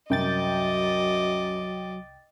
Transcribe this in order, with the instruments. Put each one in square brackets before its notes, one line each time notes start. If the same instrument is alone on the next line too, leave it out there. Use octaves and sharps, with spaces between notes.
[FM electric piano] C2 G5 A6 [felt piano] F#2 [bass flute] F#3 [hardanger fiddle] D#5 D6